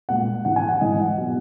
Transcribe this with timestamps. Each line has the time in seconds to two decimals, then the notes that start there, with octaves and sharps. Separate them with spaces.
0.09 A#2 G#3 F#5
0.45 G#2 E3 G#3 F#5
0.56 G#5
0.68 F#5
0.81 G#2 E3 G#3 D#5
0.99 F#5
1.17 B2 F#3